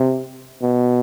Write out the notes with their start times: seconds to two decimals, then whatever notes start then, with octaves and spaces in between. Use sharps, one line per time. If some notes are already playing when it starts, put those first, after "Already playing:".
Already playing: C3
0.62 B2